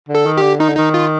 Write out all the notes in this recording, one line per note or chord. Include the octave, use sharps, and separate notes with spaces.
D3
A4
D#3
D3 G4
D#3 D#4
D3
D#3 D#4
F4